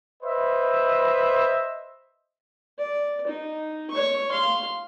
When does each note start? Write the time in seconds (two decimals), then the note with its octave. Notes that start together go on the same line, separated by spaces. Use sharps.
0.24 B4 C5 D#5 E5
2.78 D5
3.27 D#4
3.90 C#5 C#6
4.31 F5 C6